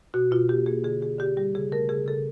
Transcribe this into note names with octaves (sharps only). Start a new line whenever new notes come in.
B2 F#4
B2 F4
A#3 G4
A#3 G#4
D3 G#4
D3 G#4
D3 G4
G3 G4
C#3 G#4
A3 A#4
C#3 G#4
C#3 A4